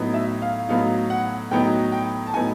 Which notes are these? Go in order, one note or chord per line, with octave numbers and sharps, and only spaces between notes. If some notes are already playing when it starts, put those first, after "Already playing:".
Already playing: A2 F#3 B3 D#4
E5
F5
A2 F#3 B3 D#4 F5
F#5
A2 F#3 B3 D#4 G5
G5
A5
A2 F#3 B3 D#4 G#5